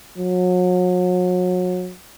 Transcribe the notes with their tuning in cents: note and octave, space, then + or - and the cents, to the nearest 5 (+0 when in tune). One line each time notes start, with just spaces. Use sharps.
F#3 -35